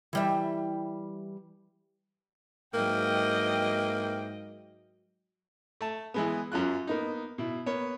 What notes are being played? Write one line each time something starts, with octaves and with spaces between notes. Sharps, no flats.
E3 G3 E5
G#2 F#3 A#3 E4 B4 D#5 G5
A3 A5
E3 G#3 B3
F#2 C#4 F4 F#6
A#3 B3 D#4
B2 E4
A#3 B3 C#5